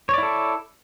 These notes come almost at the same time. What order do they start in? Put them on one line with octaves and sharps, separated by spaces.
C#5 D5 E4 A4